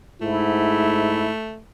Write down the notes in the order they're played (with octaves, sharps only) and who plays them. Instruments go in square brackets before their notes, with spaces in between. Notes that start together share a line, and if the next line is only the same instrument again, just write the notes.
[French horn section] G#2 [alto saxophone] A3 [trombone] E4